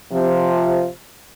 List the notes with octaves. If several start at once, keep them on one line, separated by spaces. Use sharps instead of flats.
C3 F3